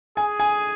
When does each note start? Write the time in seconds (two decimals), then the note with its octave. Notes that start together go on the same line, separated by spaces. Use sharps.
0.17 G#4 G#5
0.40 G#5